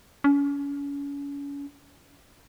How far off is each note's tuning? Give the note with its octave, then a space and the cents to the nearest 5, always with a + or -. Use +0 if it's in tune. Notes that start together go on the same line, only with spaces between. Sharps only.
C#4 +35